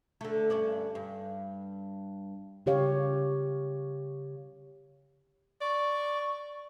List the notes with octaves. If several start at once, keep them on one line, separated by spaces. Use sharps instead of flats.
D3 A3
G2 C#4 D4
G2
C#3 G4 C#5 F5
D5 C#6